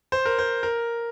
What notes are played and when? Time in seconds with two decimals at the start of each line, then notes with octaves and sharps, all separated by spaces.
0.12 C5
0.25 A#4
0.39 C5
0.63 A#4